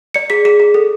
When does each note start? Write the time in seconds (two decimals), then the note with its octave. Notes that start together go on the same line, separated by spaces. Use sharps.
0.14 D5 C#7
0.30 G#4 B6
0.45 G#4 B6
0.60 G#4
0.74 A4